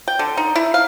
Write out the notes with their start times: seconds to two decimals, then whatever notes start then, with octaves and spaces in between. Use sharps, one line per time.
0.08 G5
0.19 D3
0.37 D#4
0.56 E4
0.74 F5